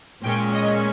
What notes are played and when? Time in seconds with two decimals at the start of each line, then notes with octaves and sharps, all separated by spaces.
0.22 A#2 G#3 C#4 G5
0.54 D#5